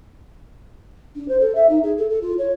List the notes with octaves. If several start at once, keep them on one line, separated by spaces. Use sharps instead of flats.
D4
C5
A4
E5
D#4
G#4
A4
A4
F4
C#5